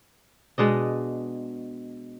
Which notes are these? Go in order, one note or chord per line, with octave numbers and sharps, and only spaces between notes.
B2 G#3 D4 D#5